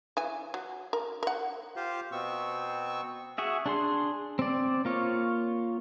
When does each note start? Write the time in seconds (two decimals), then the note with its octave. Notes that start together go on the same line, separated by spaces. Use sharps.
0.17 E3 G#5
0.54 F#3
0.93 A#4
1.23 A#4 F#5
1.76 F4 G4 C5 F5
2.12 B2 B3 C4 C#6 E6
3.38 F#4 G#4 E5
3.66 D4 G#4 C6
4.39 C4 D5
4.85 A#3 F4 C#5